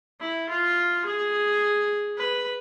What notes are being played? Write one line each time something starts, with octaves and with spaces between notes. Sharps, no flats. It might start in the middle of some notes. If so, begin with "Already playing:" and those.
E4
F4
G#4
B4